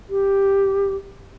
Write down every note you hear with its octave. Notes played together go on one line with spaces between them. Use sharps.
G4